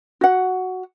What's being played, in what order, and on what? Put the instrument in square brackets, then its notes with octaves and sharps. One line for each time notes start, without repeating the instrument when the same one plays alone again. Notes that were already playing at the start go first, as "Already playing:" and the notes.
[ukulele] F#4 F#5